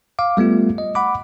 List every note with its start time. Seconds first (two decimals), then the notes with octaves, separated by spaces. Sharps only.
0.19 F5 D6
0.37 G3 A3 B3 F4
0.78 D#5
0.95 F#5 B5 D6